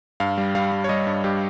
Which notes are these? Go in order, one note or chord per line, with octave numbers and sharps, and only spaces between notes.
G2 F5
G3
G3 F5
G3
C#5
G3 D#5
G2
G2 G4